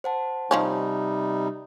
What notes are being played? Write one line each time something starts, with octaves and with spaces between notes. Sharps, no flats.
C5 F#5 A5
C3 D#3 F3 G3 C#4 D#4